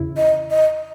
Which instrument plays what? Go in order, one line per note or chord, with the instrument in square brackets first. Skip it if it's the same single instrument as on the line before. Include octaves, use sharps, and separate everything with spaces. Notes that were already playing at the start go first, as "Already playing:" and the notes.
Already playing: [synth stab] E2 C#3 E4
[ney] D#5
D#5